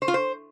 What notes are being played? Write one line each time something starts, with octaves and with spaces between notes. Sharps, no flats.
C5
F4
C5